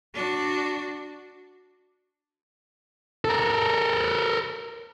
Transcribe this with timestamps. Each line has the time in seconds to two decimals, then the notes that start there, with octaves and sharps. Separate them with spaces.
0.15 D4 F#4
3.25 A4 A#4